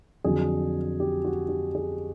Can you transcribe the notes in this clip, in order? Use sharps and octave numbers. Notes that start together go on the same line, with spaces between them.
F2 D3 F#3 G#4
G4
F#4
G4
G#4